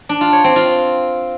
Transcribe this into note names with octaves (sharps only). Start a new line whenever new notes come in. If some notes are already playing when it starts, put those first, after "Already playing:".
D4
F4
C#5
C4
F4